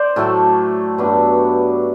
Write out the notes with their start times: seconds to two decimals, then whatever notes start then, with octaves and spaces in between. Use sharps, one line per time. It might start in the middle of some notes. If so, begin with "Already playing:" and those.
Already playing: C5 D5
0.16 A2 F#3 A3 A4
0.98 G2 F#3 B3 D4